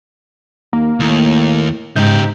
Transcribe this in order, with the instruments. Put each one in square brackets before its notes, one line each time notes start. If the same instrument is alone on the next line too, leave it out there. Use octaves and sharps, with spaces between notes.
[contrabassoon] D#2 [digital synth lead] A#3
[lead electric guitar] D#2 [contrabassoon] A2
[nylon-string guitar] G#2 [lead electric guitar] C#3 G4 [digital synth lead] G6